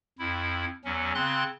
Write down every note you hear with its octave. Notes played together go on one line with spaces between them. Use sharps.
F2 E4
E2 F#3 C#4
C#3 C4 C6 F#6